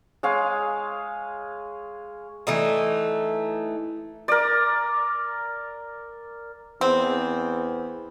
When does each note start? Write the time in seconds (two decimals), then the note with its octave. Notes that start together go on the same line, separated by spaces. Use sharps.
0.23 G#3 C#5 F5 G#5
2.47 E3 A3 D#4
4.28 A#4 D5
6.81 E2 C4